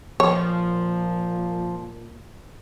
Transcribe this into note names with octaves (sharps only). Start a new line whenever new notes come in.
A#2 F3 C#5